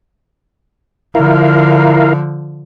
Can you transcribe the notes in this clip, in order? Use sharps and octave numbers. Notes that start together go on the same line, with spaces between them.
D3 F3 E4 A#4 F5